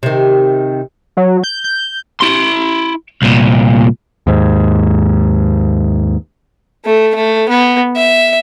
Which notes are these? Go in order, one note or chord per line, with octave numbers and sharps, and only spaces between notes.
C3 D#3
F#3
G6
G6
E4 C6
C2 A#2
D#2 G#2
A3
A3
B3
E5